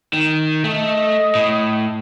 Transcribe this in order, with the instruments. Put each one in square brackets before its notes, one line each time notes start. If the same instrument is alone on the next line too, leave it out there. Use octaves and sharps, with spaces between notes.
[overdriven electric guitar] D#3
[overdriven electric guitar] A3 [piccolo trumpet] D#5
[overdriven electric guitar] A2